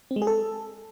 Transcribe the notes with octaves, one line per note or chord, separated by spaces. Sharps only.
C4
G#3
G#4
A4